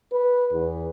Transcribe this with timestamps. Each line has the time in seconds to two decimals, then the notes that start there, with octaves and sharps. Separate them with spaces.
0.13 B4
0.53 E2